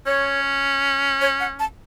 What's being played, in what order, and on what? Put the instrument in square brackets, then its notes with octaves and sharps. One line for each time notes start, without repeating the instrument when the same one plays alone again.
[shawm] C#4 [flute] C#5
[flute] C#5
F#5
A5